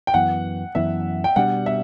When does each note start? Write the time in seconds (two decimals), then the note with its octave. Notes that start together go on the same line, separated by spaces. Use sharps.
0.07 G5
0.14 F#2 E3 B3 F#5
0.75 F#2 E3 B3 E5
1.24 G5
1.36 B2 G3 D4 F#5
1.66 E5